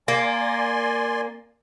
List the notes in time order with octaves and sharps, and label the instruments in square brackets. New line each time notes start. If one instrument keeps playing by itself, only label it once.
[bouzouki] A#3 [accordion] D5 G#5 C6